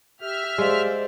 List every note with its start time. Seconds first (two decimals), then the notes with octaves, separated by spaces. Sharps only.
0.20 G4 E5 F6
0.58 G#3 G4 C5 D5 F5